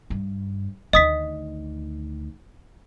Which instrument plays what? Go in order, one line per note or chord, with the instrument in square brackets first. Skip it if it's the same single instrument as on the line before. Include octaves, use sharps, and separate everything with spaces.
[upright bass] G2
[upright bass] D2 D#3 [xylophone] D#5 D#6 B6